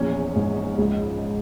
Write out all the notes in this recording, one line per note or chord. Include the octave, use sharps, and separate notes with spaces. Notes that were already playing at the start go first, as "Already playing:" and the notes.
Already playing: A#1 E2 C#4
G#2
C#2